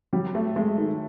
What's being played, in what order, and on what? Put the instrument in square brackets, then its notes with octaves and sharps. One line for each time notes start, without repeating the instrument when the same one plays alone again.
[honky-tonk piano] F#3 [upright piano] G3
[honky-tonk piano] A3
[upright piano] G#3 [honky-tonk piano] A3
[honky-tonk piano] D#3